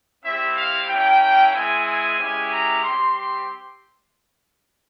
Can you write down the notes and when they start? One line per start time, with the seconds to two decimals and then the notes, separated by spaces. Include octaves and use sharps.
0.24 G3 C4 E4 E5
0.57 F5
0.88 A#3 C#4 E4 G5
1.54 G#3 C4 E4 G#5
1.85 G#5
2.19 G#3 C#4 E4 G4 G#5
2.51 A#5
2.83 G3 C4 G4 C6
3.15 C6